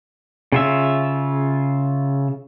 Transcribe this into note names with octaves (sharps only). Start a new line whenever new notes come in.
C#3 F4 E5